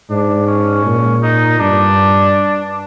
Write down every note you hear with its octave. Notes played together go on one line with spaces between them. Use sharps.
G#2 D4
C#4
A#2
D#4
G2 D4